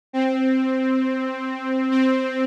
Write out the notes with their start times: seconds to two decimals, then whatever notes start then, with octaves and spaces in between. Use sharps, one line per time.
0.13 C4
1.91 C4